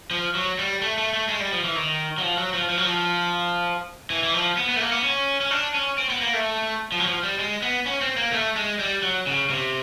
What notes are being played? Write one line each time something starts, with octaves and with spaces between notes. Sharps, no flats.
F3
F#3
G3
A3
A3
A3
G#3
G3
F3
E3
D#3
F#3
F3
F#3
F3
F3
F#3
F3
E3
E3
F3
B3
B3
A3
A#3
B3
C#4
C#4
D4
C#4
C4
B3
A#3
A3
F3
F#3
F3
G3
G#3
B3
C#4
C4
A#3
A3
G#3
G3
F#3
C#3
C3